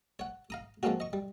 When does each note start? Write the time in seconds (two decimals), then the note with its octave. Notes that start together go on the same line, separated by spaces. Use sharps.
0.19 C#5 F#5
0.50 F5 A#5 D#6
0.83 F3 G#3 A#3 C4 C#4 F#4
1.00 D#5 C#6
1.13 G3